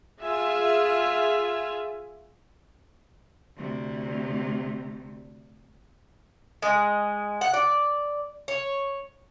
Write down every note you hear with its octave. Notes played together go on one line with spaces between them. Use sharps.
F4 G#4 E5 G#5
D2 C3
G#3
F#5
D5
C#5